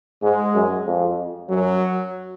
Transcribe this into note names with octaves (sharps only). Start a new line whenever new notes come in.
G#2 G#3
F#2
F2
F#2 F#3